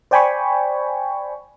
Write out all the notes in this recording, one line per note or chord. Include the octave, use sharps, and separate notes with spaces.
C5 D5 G5 G#5 B5 C#6